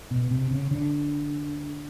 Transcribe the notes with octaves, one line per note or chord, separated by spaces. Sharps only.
B2
C3
C#3
D3